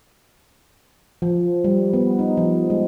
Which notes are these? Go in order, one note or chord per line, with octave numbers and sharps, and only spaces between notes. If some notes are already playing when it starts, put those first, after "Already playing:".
F3
G3
B3
D#4
F3
G#3